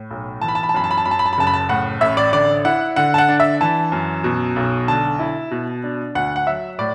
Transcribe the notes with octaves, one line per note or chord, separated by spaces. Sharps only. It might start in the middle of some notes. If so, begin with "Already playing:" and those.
Already playing: A2
B1
E3 A5
B5
A5
B5
A5
F#2 B5
A5
B5
A5
F#2 B5
A5
B5
A5
B5
F#1 A5
B5
A5
A2 F#5
A1 E5
D5
D3 D5
E4 F#5
D3 F#5
A5
F#5
D4
E5
E3 A5
F#2
B2
B1
D3 A5
E4
B2
D4
D2 F#5
F#5
F#3 E5
A2 D5